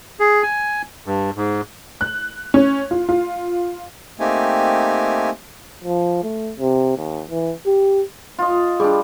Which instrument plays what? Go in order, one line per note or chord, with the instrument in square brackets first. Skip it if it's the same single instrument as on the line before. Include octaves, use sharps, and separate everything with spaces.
[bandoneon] G#4
G#5
G2
G#2
[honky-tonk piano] F#6
C#4
F4
F4
[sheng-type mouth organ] A3 A#3 C4 D#4 G4 G#5
[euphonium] F3
A3
C3
D#2
E3
G4
[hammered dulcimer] F4 D#5
[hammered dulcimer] G3 D4 [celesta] G#4